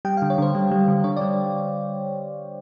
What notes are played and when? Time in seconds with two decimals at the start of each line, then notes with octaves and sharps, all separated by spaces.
0.05 G3 G5
0.17 D3 F5
0.30 C#5
0.38 D3 C5
0.55 G3
0.71 G3
0.88 D3
1.04 D3 C#5
1.17 D5
1.21 G3